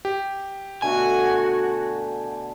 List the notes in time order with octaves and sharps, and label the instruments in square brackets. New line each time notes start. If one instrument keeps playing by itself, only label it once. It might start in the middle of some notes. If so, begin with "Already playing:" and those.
[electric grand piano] G4
[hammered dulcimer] B2 D3 A3 [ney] F#4 [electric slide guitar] G#5